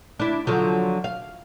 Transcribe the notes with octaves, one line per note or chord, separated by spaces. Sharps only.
D4 E4
D3 F3 F#3
F5